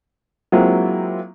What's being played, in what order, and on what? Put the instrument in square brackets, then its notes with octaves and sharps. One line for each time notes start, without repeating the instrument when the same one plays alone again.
[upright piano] F#3 G#3 A#3 C4 E4 F4